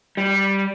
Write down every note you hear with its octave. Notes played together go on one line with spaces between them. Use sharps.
G3